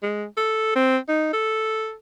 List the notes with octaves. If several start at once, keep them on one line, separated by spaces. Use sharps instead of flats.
G#3
A4
C4
D#4
A4